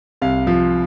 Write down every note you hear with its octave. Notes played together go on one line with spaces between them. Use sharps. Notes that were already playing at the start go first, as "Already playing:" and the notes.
C2 F5
F3